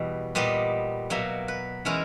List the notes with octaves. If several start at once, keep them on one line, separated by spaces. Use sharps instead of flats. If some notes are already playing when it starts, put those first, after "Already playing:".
Already playing: E2 B2 G3 D#5
A#2 G3 B3 D#5
B2 F#3 A#3 E5
B4
E3 G#3 C#4 E4 A#4